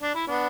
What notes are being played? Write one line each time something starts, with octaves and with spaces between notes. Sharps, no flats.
D4
E4
B3 D4